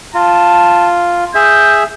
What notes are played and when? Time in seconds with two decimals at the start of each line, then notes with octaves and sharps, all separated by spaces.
0.15 F4 A5
1.35 G#4 E5 G6